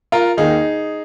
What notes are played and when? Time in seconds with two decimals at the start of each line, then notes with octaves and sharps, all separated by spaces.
0.12 F4 A#4
0.37 D#2 D#3 D#4 G#4